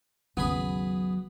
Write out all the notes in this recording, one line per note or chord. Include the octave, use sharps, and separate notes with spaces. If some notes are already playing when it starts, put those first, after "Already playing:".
G#1 D#2 C#3 F#3 B3 G#4 B5